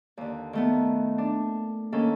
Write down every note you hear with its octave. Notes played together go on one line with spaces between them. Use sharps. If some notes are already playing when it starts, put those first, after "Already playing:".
D#2 D3
D#3 A3 B3
D4
D#3 A#3 C#4 A4